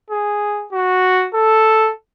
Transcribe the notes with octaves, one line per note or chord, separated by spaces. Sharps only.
G#4
F#4
A4